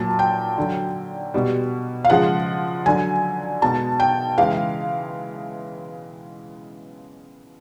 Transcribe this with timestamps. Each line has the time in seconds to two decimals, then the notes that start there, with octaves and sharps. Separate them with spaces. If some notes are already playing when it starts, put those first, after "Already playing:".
Already playing: A#2 F#3 A5
0.19 G5
0.58 D3 F#3
1.34 B2 G3
2.05 F5
2.10 C#3 F3 G#3 F#5
2.86 D3 F#3 G#5
3.62 B2 G#3 A5
4.00 G5
4.38 C#3 E3 G#3 F5